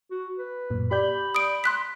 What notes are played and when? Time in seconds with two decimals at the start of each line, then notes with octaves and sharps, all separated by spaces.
0.11 F#4
0.39 B4
0.70 F#2 A#2
0.91 G4 D5 B5 G6
1.35 D#6 D7
1.64 C6 F#6 B6